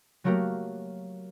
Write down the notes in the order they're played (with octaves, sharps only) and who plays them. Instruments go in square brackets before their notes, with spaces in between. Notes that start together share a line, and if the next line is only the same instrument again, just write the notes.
[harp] F#3 A3 A#3 F#4 G4 A#4